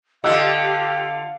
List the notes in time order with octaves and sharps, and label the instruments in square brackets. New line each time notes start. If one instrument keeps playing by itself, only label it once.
[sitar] D3 F4 [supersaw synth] G4 [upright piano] D#5 E6 F#6 [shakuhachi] F5